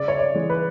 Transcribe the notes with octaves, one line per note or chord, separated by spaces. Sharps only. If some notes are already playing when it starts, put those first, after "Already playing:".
Already playing: C#3 D5
C#5
D5
E3 G#3
B4